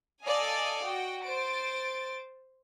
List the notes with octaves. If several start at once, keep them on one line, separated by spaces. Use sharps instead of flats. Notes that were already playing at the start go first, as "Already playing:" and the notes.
A4 D5 D#5 F5 G#5
F#4 G5
C5 A6 D7